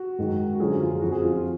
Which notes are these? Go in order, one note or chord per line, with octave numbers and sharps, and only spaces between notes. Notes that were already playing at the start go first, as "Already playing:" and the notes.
Already playing: F#4
G#2 D#3 F#3
F#4
F#2 D3 F3 G#4
F#4
F4
G#4
F2 F3 F#4
G#4
F4
F4